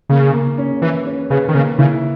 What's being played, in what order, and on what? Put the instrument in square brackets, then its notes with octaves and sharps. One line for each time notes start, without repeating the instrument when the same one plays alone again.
[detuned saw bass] C#3 [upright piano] A#3
[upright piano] A#3
C#4
[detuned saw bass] E3 [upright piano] B4
[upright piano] C#4
[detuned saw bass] C#3 [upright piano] B4
[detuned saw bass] D#3
[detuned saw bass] C#3 [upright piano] A#3
[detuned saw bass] C#3 [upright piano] E4